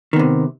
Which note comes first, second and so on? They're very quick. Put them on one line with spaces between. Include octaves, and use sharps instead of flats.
D#3 B3 C3